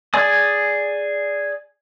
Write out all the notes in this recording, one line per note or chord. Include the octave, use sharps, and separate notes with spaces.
G#4 D5 G#5 D#6